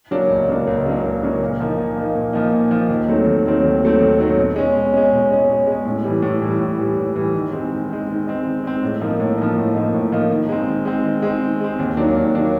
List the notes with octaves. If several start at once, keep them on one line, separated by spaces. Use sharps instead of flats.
C#3 F#3 A#3 D4
C#2
C#3 F#3 A#3 D4
C#2
C#3 F#3 A#3 D4
C#2
C#3 F#3 A#3 D4
A#2
F3 A#3 D#4
A#2
F3 A#3 D#4
A#2
F3 A#3 D#4
A#2
F3 A#3 D#4
D#2
D#3 F#3 A3 C4
D#2
D#3 F#3 A3 C4
D#2
D#3 F#3 A3 C4
D#2
D#3 F#3 A3 C4
B2
G#3 C#4
B2
G#3 C#4
B2
G#3 C#4
B2
G#3
C#4
A2
E3 G3
A2
E3 G3
A2
E3 G3
A2
E3 G3
D#3
G#3 C4
D#3
G#3 C4
D#3
G#3 C4
D#3
G#3 C4
A2
F3 A#3 D#4
A2
F3 A#3 D#4
A2
F3 A#3 D#4
A2
F3 A#3 D#4
D#3
G#3 C4
D#3
G#3 C4
D#3
G#3 C4
D#3
G#3 C4
D#2
D#3 F#3 A#3 D4
D#2
D#3 F#3 A#3 D4